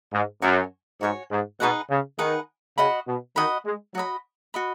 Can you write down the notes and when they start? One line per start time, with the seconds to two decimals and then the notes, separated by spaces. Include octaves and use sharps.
0.13 G#2
0.42 F#2 F#4 C#5 G#5
1.01 G#2 F#4 C#5 G#5
1.31 G#2
1.60 B2 D#4 G#4 B4 F#5
1.90 C#3
2.19 D#3 D#4 G#4 B4 F#5
2.77 C#3 F#4 D#5 F#5 B5
3.07 B2
3.36 D#3 F#4 D#5 F#5 B5
3.66 G#3
3.95 F#3 F#4 D#5 B5
4.54 F#4 D#5 B5